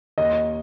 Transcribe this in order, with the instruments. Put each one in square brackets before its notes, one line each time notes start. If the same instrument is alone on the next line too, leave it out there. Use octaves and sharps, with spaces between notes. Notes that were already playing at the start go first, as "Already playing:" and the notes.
[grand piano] D#2 D#5